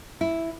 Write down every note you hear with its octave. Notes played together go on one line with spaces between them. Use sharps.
E4